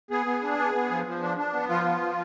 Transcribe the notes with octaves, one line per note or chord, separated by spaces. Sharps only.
B3 G#4
B3
D4
B3
B3
F3
F3
D4
D4
B3
F3 F4
B3
F3